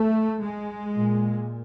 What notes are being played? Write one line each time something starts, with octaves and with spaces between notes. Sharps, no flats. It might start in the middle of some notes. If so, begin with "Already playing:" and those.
Already playing: A3
G#3
A#2